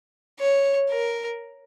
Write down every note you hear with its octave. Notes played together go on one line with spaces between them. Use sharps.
C#5
A#4